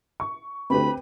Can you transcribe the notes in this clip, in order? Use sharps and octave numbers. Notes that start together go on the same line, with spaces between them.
C#6
D2 C4 G4 B4 B5